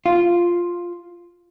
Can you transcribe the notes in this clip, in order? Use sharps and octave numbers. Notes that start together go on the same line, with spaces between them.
F4